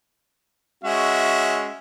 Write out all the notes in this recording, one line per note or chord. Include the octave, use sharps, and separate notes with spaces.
G#3 C#4 F#4 E5